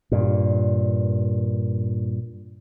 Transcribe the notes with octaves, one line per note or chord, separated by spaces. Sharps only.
G2 A#2